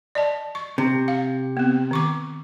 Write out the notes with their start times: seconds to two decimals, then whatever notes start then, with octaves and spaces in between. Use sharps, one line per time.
0.15 D5 D#5 A5
0.55 C#6
0.78 C3
1.08 F5
1.57 B3 C4
1.91 D#3 C#6 D6